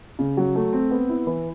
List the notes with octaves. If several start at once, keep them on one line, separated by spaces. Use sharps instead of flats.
C#3
F#3
A3
C4
B3
E4
E3